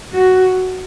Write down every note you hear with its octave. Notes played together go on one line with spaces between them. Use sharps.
F#4